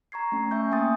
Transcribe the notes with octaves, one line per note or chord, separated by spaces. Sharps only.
A#5 C#6 G#6 C7
A3 C#4
E5 G#5 C#6 G6
A#3 G5 G#5 C6 D#6 A6